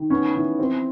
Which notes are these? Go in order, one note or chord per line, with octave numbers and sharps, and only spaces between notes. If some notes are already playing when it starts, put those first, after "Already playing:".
Already playing: D#3
B3 C#4
E3
C4